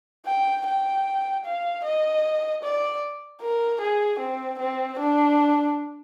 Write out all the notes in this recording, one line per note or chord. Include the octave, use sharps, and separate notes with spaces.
G5
G5
F5
D#5
D5
A#4
G#4
C4
C4
D4